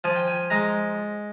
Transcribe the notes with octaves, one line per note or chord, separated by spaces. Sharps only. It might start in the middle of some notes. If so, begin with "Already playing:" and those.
F3 G#5
G5
G#5
G#3 A#5